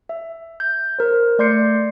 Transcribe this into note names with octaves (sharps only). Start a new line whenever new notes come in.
E5
G6
A#4 C5
A3 D5 C6 G6 C7 C#7